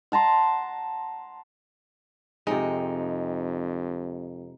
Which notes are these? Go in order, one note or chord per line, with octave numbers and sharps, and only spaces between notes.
F#5 A5 A#5 C6
F2 C3 G#3 D#4